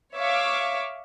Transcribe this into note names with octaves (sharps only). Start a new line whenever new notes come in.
C#5 E5 F5 C#6 D6